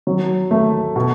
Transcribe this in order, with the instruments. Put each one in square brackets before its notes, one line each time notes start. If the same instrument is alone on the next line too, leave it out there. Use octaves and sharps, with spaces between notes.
[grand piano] F#3
A3
B2